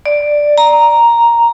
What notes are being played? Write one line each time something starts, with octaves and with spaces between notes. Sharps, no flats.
D5
A#5